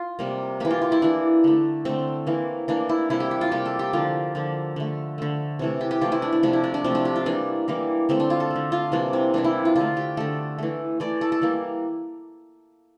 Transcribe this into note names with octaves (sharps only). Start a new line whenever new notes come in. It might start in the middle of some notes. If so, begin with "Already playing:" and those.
Already playing: F4
C3 G3 A#3
E3 A#3 G4
F4
F4
E4
E3 A#3 D4
D3 A3
D3 A3 C4
E3 A#3
E3 A#3 D4
E4
C3 G3 A#3 E4
G4
G4
F4
C3 G3 A#3 G4
A4
G4
D3 F3 A#3 F4
D3 F3 A#3
D3 A3
D3 A3
C3 E3 A3
G4
G4
C3 E3 A3 F4
E4
D4
D4
C3 F3 A3 D4
E4
D4
D4
C3 F3 A3 C4
D4
G4
F4
E3 G3 A#3 D4
E3 G3 A#3
D3 A3 C4
D4
F4
A4
A3
D3
F4
C3 E3 G3 A#3 D4
C4
C3 E3 G3 A#3 D4
E4
F4
D3 A3 F4
G4
D3 A3 A4
E3 A3
E3 A3 D5
A4
A4
E3 G3 A#3